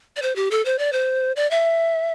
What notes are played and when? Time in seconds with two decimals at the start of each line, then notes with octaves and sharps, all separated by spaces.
0.16 D5
0.22 C5
0.36 G4
0.51 A4
0.65 C5
0.79 D5
0.93 C5
1.36 D5
1.51 E5